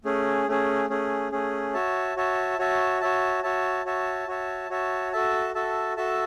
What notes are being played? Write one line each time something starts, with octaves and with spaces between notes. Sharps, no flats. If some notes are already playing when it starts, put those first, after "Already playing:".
A3 C#4 G#4
A3 C#4 G#4
A3 C#4 G#4
A3 C#4 G#4
F#4 C#5 E5 A5
F#4 C#5 E5 A5
F#4 C#5 E5 A5
F#4 C#5 E5 A5
F#4 C#5 E5 A5
F#4 C#5 E5 A5
F#4 C#5 E5 A5
F#4 C#5 E5 A5
F#4 A4 E5 A5
F#4 A4 E5 A5
F#4 A4 E5 A5